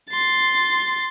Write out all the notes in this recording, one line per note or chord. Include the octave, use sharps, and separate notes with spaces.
C6 A6